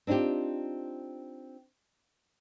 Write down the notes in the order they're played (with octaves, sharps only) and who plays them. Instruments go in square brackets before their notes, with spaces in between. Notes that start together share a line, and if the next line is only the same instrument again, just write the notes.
[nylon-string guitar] C4 D4 D#4 F4 G4